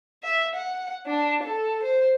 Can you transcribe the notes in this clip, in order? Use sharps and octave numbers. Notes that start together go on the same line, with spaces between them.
E5
F#5
D4
A4
C5